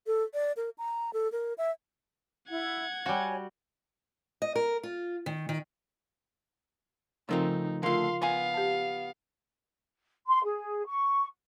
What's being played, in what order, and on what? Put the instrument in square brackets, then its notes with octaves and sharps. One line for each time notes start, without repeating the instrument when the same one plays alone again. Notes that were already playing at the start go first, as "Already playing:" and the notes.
[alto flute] A4
D5
A#4
A#5
A4
A#4
E5
[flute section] E4 [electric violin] F#5 G#6
[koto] G3 F#4 [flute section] C#5 G#5
[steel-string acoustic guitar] D#5
A#4
F4
D#3
D#3
[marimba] C#3 F3 A#4 [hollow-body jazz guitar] A3 C4 F4 [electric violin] D#4
[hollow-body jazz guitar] D3 A3 [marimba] F4 A#4 [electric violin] F5 C6
[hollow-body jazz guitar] B3 G#5 [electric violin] F5
[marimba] G4 A5
[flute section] C6
G#4
C#6